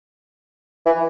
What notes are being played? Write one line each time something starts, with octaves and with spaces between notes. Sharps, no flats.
E3